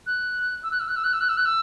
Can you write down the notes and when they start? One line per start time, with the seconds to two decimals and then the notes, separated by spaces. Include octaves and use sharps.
0.06 F#6
0.63 E6
0.71 F#6
0.80 E6
0.88 F#6
0.96 E6
1.04 F#6
1.13 E6
1.21 F#6
1.29 E6
1.37 F#6
1.45 E6